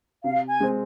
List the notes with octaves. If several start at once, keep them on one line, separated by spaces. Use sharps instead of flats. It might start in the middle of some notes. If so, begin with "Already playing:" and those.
C3 F5
G#5
G#3 C4